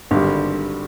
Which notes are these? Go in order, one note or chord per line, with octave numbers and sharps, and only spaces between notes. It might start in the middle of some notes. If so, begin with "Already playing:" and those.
G#1 G2 D3 G3